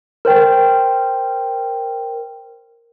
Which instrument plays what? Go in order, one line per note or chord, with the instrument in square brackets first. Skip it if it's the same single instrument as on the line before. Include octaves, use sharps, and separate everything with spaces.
[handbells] A#4 C5 G5